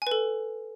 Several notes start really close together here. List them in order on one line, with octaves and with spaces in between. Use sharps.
G#5 B4 A4